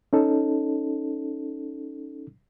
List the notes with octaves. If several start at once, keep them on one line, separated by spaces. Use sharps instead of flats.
C#4 D#4 A4